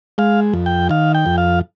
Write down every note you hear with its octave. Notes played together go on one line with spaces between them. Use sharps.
G#3 F5
F2
G5
D#3 F5
G5
F2
F5